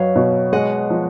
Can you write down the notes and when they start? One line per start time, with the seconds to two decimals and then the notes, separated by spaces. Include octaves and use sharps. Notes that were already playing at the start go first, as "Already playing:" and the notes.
Already playing: F#2 F#3 B4 C#5 D#5 F5
0.16 B2
0.53 G#3 D#5 F#5
0.90 F3